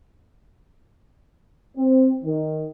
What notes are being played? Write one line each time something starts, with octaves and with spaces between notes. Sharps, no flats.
C4
D#3